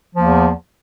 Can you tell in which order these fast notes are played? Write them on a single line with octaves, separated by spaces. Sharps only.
F3 A#3 E2